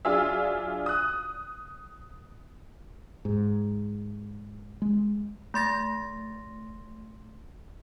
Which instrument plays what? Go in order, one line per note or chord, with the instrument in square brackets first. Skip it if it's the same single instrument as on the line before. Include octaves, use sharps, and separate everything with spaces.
[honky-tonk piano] F#3 D4 F4 G#4 E5
D#6 F#6
[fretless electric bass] G#2
G#3
[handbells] A3 C6 A6 A#6